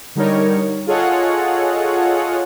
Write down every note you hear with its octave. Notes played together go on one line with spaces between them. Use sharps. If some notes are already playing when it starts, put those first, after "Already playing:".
D3 G3 D#4 A#4 C#5
F4 G#4 A4 C#5 D#5 F#5